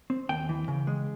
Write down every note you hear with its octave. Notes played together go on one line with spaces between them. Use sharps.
C4
D#2 G5
E3
C#3
G#3